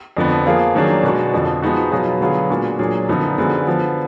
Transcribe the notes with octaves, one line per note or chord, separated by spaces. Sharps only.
F2 D3 F3 B3
F3 A#3 F4 G#4
D#3 F#3 A#3 D4 G#4
B2 G#3 D4 F#4
F2 D3 F3
F3 G#3 B3 D#4 F#4
B2 F#3 B3 F4 G#4
D3 F#3 B3 F4 G#4
A#2 G#3 D4 F#4
A#2 F#3 D4 G#4
F#2 D3 F3 B3 D#4
F#2 D3 F3 G#3 B3
D3 F3 B3